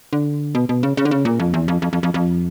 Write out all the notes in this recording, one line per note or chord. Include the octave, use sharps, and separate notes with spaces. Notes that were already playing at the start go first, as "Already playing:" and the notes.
D3
B2
B2
C#3
C#3
D3
C#3
A#2
F2
E2
F2
F2
F2
F2
F2